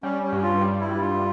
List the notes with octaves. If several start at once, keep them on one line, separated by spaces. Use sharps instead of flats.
G3 C#4
C#4
G2
F4
G3
E4
G2
F4